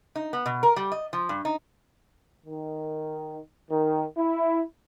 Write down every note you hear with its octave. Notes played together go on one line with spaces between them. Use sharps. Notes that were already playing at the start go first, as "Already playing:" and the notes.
D#4
B3
B2
A#4
G3
D#5
F3
G2
D#4
D#3
D#3
E4